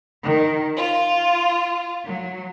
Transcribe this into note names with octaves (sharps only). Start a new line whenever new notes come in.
D#3
F4
F#3